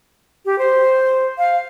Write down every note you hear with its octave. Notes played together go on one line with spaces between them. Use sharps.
G4
C5
F5